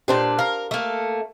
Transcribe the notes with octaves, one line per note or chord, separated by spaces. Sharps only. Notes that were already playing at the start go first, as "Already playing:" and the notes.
A#2 D4 G4 B4 C5
A#4 F5
A3 A#3